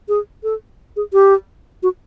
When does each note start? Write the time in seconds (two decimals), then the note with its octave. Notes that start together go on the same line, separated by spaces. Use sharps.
0.09 G#4
0.44 A4
0.96 G#4
1.13 G4
1.83 F#4